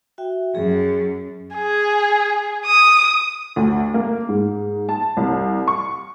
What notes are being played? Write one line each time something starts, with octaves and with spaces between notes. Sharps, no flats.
F#4 E5 G5
F#2 G#4
G#4
D#6
D2
A#3
G#2
A5
C2
C#6